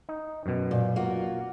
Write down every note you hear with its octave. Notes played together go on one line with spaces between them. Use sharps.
D#4
F#2 B2
A#2
A#3 F4 F#4